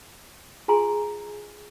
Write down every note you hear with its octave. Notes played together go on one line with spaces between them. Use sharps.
F4 G#4 G#5 A#5 C6